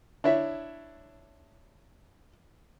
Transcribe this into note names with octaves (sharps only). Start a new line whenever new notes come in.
D4 E4 C#5 E5